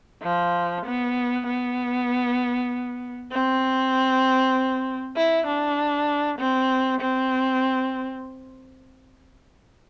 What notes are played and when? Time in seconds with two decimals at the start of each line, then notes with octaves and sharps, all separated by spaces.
0.23 F3
0.85 B3
1.46 B3
3.32 C4
5.16 E4
5.47 D4
6.39 C4
7.01 C4